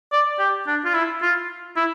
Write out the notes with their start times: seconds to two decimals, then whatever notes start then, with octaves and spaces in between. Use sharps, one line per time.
0.13 D5
0.39 G4
0.67 D4
0.85 F4
0.95 E4
1.22 F4
1.76 E4